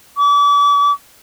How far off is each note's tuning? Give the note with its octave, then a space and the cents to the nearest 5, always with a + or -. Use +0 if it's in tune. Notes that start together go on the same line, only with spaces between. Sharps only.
D6 -40